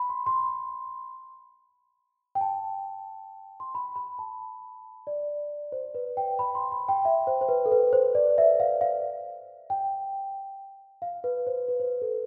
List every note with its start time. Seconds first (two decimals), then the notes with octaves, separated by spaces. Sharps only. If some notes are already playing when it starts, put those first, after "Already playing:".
Already playing: B5
0.09 C6
0.26 C6
2.35 G5
2.41 A5
3.60 C6
3.75 B5
3.96 B5
4.19 A5
5.07 D5
5.72 C5
5.95 B4
6.17 G5
6.39 B5
6.55 C6
6.72 B5
6.89 G5
7.05 E5
7.27 C5
7.41 C5
7.49 B4
7.66 A4
7.72 B4
7.93 C5
8.15 D5
8.38 E5
8.60 F5
8.81 F5
9.70 G5
11.02 F5
11.24 B4
11.47 C5
11.68 B4
11.80 C5
11.84 B4
12.02 A4